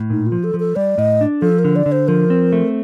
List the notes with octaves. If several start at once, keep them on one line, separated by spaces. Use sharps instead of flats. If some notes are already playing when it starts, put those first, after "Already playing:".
Already playing: A2
A#2 D#4
F4
F3
A4
F3
A4
G3 D5
A2 D#5
D4
F3 A4
A#4
D3
D5
D3
C5
F3 A#4
C4
A3